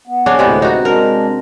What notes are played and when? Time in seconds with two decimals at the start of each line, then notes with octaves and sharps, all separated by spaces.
0.07 B3
0.26 C#3 C#4 D4
0.39 D2 A2 C3 G#3 B3 D5
0.62 D#4 F#4
0.85 G#3 D4 A#4